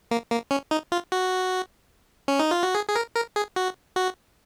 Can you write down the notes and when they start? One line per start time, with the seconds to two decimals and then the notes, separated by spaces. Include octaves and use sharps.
0.11 A#3
0.32 A#3
0.51 C#4
0.71 D#4
0.92 F4
1.12 F#4
2.28 C#4
2.39 D#4
2.51 F4
2.63 F#4
2.75 G#4
2.89 G#4
2.96 A#4
3.15 A#4
3.36 G#4
3.56 F#4
3.96 F#4